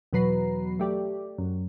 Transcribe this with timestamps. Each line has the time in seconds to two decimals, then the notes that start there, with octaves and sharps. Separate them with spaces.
0.13 E2 B2 F#3 B4 A#5 C7
0.80 A3 G4 D5
1.38 F#2